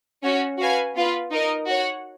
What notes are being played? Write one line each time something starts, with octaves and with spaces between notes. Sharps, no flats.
C#4 F#4 C#5
F#4 B4 F5 G#5
B3 F4 B4
D#4 A#4 D#5
F#4 C#5 F#5